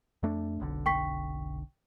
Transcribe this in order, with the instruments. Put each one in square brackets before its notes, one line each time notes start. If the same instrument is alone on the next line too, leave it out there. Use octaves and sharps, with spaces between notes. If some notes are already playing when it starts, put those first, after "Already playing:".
[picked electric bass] F2 A3 D4
F1 B1 D3
[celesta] G5 C#6 B6